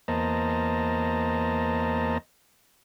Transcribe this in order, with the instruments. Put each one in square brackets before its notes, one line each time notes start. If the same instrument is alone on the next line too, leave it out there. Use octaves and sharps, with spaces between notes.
[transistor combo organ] E2 A#3 C5 D#5 A5 A#5